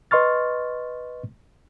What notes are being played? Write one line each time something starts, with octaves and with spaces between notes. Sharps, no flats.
B4 D#5 C6 C#6 F6 A6